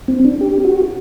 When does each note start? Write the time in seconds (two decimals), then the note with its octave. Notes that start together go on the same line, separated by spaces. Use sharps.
0.08 C4
0.25 D4
0.41 G4
0.65 F#4